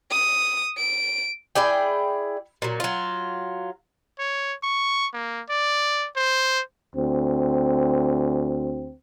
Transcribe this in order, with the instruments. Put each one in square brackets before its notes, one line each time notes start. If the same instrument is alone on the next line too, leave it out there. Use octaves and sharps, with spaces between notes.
[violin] D#6
D7
[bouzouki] E4 G#4 D5 G5
A#2 F#3
F#3 F4
[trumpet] C#5
C#6
A#3
D5
C5
[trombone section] D2 C4